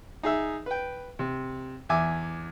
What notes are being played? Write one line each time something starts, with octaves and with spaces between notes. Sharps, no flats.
D#4 G#4 E5
B4 G5
C3
E2 E5 G#5 D6